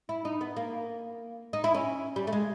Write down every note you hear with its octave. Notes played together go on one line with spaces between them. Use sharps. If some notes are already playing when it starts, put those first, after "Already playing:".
E4
D#4
B3
A#3
D#4
E4
C#4
G3
A3
G#3